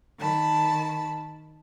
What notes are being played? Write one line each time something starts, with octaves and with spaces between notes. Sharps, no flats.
D#3 A5 B5